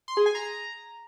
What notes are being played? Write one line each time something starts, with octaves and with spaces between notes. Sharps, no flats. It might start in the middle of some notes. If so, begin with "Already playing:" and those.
C6
G#4
G#5
A#5